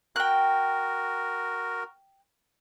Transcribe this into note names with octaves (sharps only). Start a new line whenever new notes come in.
F#4 A#4 G5 F#6